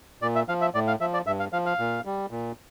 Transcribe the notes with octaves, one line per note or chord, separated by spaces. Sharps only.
A#2 D5
E5
F3 F5
E5
A2 D5
F5
F3 E5
D5
G2 E5
F5
F3 F5
F5
A#2
G3
A#2